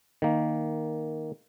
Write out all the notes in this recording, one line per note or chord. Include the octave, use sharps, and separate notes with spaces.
D#3 A#3